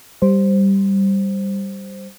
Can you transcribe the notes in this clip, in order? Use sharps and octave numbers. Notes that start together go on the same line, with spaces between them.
G3 C5